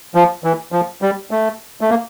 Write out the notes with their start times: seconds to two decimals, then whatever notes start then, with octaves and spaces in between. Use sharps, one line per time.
0.15 F3
0.44 E3
0.72 F3
1.02 G3
1.31 A3
1.81 A3
1.90 A#3